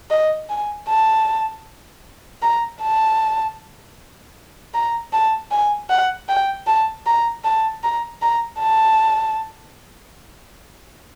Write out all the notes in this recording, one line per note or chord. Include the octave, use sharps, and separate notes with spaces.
D#5
G#5
A5
A#5
A5
A#5
A5
G#5
F#5
G5
A5
A#5
A5
A#5
A#5
A5